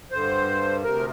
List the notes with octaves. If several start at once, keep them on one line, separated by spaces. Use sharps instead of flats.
G2 D3 C5
D2 C3 A#4